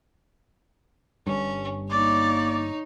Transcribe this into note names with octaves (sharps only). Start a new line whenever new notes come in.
G1 G2 C#4
A#3 D#4 C#5 D5